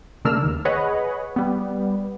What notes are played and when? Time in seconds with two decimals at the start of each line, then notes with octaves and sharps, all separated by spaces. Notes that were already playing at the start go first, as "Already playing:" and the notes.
0.25 C#3 A3 A#3 D4 E6 F6
0.43 D#2
0.65 G#4 B4 C#5 D#5 F#5
1.36 G3 B3